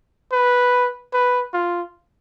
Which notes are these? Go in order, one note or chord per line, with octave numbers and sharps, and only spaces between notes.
B4
B4
F4